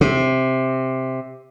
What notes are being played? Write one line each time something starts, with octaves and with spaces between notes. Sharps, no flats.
C3